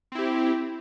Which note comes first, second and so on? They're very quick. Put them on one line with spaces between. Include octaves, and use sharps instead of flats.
C4 E4 G4